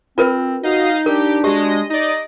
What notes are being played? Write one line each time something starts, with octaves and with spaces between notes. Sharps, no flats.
C4 F4 A#4 B4
D#4 F#4 D#5 F5 C7
D4 G4 A#4
G#3 F#4 G4 D#5
D#4 D5 D#5